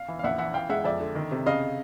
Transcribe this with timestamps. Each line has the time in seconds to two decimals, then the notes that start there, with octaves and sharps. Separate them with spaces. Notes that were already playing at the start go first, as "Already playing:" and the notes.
Already playing: F5
0.08 E3
0.19 F5
0.23 A#1 E5 F#5
0.38 E3 E5 F#5
0.54 E3 F5 G5
0.69 G#3 E5 F#5
0.84 F2 D5 E5
1.00 D3
1.15 D#3
1.31 C3
1.46 C#3 D#5 F5